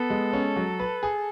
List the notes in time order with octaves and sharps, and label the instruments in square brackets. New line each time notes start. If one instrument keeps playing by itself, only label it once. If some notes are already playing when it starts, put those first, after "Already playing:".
Already playing: [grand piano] B3 [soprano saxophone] A4
[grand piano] G#3
C#4
F#3
B4
G#4